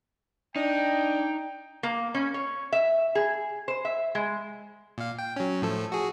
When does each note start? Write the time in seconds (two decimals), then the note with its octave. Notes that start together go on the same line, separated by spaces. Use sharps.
0.56 D4 D#4 G5
1.83 A#3
2.15 C#4
2.34 C#5
2.72 E5
3.15 G#4
3.68 C5
3.85 E5
4.15 G#3
4.98 A#2 F5
5.19 G5
5.36 F#3 C#4
5.62 A2 F3 A4
5.92 F#4 G#4